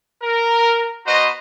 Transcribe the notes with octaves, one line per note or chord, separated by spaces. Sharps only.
A#4
B3 F#4 B4 C5 D#5 A#5